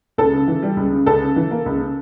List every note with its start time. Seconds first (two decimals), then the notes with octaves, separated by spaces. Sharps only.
0.18 C#2 A4
0.33 C#3
0.48 E3
0.62 G3
0.77 C#2
0.92 C#3
1.06 C#2 A4
1.22 C#3
1.36 E3
1.51 A#3
1.66 C#2
1.80 C#3